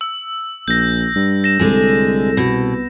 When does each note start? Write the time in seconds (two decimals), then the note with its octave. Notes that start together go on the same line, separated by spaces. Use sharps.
0.01 E6
0.68 A#1 G6 A#6
1.15 G2
1.44 A#6 E7
1.59 C2 D3 G#3 G#4
2.37 B2